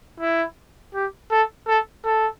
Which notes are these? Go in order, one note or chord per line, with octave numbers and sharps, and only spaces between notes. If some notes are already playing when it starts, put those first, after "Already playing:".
E4
G4
A4
A4
A4